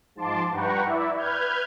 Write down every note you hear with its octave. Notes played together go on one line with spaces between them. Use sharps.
G#2 F3 A5 C6 D6
G2 B4 F#5 G5 A#5 C#6
E4 D5 E5
B4 F6 G6 G#6